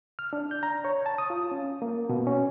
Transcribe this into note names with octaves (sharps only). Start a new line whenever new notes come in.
F6
D4
G6
A#5
C#5
A5
D#6
F4
C#4
A#3
B2
C#4